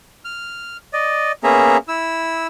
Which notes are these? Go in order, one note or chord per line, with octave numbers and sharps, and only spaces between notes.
F6
D5 D#5
A#3 B3 C#4 G#4 E5 A#5
E4 E6